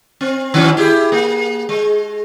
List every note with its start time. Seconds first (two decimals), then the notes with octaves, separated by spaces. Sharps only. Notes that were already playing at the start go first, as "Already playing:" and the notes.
0.21 C4
0.54 D#3 F#3 C#4
0.77 E4 G4 G#4
1.12 A#3
1.69 G#3